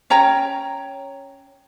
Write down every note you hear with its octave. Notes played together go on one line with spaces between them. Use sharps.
C#4 C#5 G5 A#5